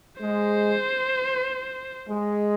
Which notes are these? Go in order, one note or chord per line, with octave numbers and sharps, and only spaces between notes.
G#3 C5
G#3